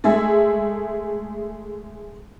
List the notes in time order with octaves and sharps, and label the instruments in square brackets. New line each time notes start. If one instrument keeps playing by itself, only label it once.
[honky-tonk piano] G#3 A3 G#4 E5